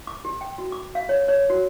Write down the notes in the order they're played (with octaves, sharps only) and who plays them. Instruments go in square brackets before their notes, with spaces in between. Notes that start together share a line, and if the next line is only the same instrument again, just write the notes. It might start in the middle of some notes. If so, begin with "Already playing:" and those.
[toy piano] D6
G4
G5
F#4
D6
F5
C#5
C#5
F#4